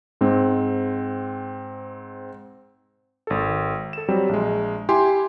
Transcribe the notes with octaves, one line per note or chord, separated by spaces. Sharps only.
G#2 C4
G#1 A4
A4 E7
F#3 G3 C4
A#1 G#3
E4 G4 G#5 C6